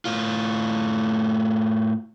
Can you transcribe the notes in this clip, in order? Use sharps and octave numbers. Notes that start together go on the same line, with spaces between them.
A2 F4